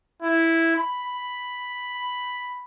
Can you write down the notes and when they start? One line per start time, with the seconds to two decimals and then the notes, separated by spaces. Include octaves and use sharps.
0.22 E4
0.76 B5